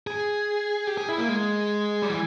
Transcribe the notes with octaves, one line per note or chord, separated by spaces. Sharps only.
G#4
G4
G#4
E4
A#3
G#3
G3
E3